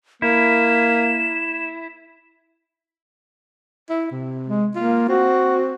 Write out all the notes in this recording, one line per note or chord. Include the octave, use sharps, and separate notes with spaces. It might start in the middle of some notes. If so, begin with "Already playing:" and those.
A#3 E4 E7
E4
C3
G#3
A#3 F4
C4 F#4